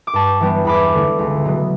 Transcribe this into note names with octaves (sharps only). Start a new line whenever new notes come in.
D6
G2 A5 C#6
E3 G3 B3 D4
E2 B5 D6
D3 A3 E4
C#2
B2 F#3 B3